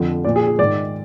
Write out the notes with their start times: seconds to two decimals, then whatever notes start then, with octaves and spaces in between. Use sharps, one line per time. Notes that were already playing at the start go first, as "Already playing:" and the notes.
Already playing: F2 D3 F3
0.24 A#2 F3 D5
0.36 G#4
0.48 G#4
0.58 G#2 D#3 D5